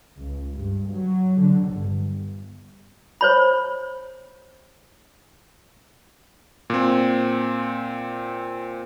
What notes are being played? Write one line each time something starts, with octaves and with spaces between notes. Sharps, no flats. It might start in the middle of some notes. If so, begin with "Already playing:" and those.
C#2
G2
F#3
D3
G1
C5 C#5 B5
A#2 C4